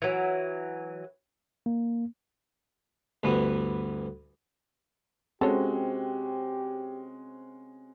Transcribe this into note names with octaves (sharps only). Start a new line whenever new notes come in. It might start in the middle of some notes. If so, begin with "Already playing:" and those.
E3 F#3
A#3
D2 G2 E3 B3
G#3 C4 C#4 F#4 G4 A4 C#5